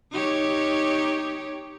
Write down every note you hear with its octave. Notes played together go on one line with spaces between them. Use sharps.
D#4 G4 C#5